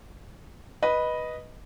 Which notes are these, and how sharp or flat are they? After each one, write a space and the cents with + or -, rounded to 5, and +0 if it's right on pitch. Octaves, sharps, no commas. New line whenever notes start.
B4 -10 D#5 +0